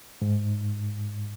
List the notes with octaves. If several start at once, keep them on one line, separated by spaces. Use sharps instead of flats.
G#2